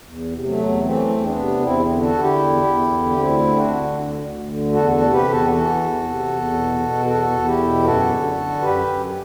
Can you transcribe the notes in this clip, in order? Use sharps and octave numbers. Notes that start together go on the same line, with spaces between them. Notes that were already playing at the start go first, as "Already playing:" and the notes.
E2
C3
F#3 A3
E2
E3 A3 C4
E2
B3 D4
C3
E2 C4 E4
D3
F#4 A4
D3
E4 G4
E2
E2
D3
D2 C4 E4
D3
D4 F#4
D3
D2
D2
D3
E2 F#4 A4
F#4 A4
C3
G4 B4
E2
F#4 A4
E3 F#4 A4
E2
C3
E2
B2
B2
E2 F#4 A4
E2
E4 G4
B2
F#2 F#4 A4
D3
D3
F#2 G4 B4
F#2